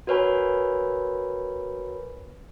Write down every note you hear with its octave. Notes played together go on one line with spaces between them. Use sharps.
F#4 A#4 B4 C#5 G#5 B5